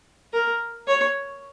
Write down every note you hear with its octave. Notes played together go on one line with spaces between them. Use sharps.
A#4
C#5